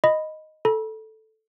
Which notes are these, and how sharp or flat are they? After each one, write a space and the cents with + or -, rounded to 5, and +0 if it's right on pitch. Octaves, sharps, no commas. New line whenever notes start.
D#5 +0 B5 +5
A4 +0 B5 -45